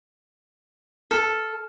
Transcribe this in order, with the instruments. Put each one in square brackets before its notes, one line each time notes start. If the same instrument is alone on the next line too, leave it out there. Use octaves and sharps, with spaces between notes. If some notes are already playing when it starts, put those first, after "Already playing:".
[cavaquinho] A4 [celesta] F6